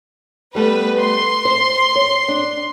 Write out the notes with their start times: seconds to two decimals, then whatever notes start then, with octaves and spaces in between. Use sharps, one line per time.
0.55 G3 A3 B3 B4
1.01 C6
1.45 C5
1.96 C#5
2.28 D4